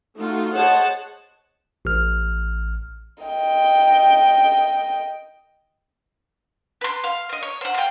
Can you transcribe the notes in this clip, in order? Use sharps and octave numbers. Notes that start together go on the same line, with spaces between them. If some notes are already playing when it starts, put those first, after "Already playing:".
A3 D#4 F4 F#4
G#4 C5 C#5 D#5 F#5 A5
A1 F6
D#5 G5
B4 C6
F5
C5 D#5
C#5
C5 F#5
F5 G5